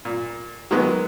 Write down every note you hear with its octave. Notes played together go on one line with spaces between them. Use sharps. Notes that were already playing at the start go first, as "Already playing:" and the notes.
A#2
D#3 F#3 G#3 B3